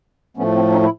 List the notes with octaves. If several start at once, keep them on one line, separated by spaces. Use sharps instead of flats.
A2 F3 A3 B3 C#4
C4
C#4 D#4
E4